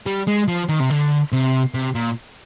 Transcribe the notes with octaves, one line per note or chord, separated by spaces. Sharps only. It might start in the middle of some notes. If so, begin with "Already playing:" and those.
G3
G#3
F3
D#3
C3
D3
C3
C3
A#2